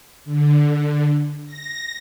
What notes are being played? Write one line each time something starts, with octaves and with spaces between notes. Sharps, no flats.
D3
A#6